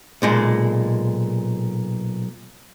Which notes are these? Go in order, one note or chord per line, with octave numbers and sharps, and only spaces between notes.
B1 A#2 G#3